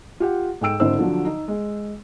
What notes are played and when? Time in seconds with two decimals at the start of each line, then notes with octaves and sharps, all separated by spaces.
0.20 F4 G4 F#5
0.61 G#2 A4 G5 E6 D7
0.80 G#1 D3 E4 C5 E6
0.99 D3 F3 F#3
1.25 D#4
1.48 G#3